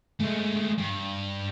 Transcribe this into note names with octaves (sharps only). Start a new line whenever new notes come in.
G#3 A3
G2